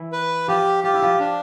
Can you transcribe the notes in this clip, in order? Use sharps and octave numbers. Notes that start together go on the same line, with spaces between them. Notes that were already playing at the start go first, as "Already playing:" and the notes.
Already playing: E3 E4
B4
F3 F4 G4
F4 G4
E4
F3 F4
D4